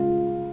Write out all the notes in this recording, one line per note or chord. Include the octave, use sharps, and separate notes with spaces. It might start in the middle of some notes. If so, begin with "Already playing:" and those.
Already playing: C#2 C#3 G#3 F4